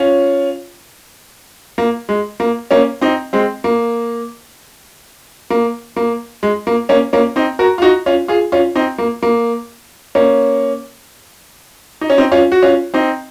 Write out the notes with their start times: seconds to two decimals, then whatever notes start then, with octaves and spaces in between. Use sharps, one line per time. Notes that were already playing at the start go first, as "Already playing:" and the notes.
Already playing: C#4 F4
1.78 A#3
2.09 G#3
2.40 A#3
2.71 A#3 C#4
3.01 C4 D#4
3.33 G#3 C4
3.64 A#3
5.50 A#3
5.96 A#3
6.43 G#3
6.67 A#3
6.89 A#3 C#4
7.13 A#3 C#4
7.36 C4 D#4
7.59 F#4 A#4
7.78 F4
7.82 D#4 F#4
8.06 C#4 F4
8.28 F4 G#4
8.52 C#4 F4
8.76 C4 D#4
8.98 A#3
9.22 A#3
10.15 A#3 C#4
12.01 D#4
12.10 C#4
12.18 C4 D#4
12.32 C#4 F4
12.52 F#4
12.62 C#4 F4
12.94 C4 D#4